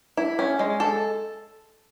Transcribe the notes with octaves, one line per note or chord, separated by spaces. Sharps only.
E4
C#4
G#3
A4